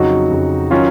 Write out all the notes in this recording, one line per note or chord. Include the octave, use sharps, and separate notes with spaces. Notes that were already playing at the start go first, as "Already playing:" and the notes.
Already playing: F2 C#3 F#3 D#4 F#4
F2 C#3 F#3
D#3 F#3 C#4 F4